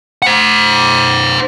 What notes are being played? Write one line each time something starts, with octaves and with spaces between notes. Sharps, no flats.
C5 F#5